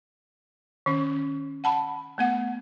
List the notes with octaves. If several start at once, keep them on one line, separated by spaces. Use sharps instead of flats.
D#3 C#4
F#5 A5 B5
A3 B3 F#5